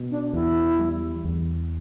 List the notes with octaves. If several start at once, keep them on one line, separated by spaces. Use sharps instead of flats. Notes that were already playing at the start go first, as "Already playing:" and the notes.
Already playing: B2
D4
E2 E4
G3
E2